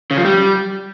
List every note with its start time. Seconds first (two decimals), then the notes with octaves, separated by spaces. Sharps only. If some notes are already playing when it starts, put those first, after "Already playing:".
0.11 C#3
0.18 F3
0.25 G3